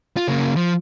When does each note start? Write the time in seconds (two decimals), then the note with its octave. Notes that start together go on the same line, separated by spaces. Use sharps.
0.17 F4
0.28 C#3 A#3
0.56 F3